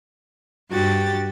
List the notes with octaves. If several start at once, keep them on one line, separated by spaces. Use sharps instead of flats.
G2 F#4 G4 A6